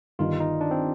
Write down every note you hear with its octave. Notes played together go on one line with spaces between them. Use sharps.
G1 G2 D#3 F4
D#4
D4
C4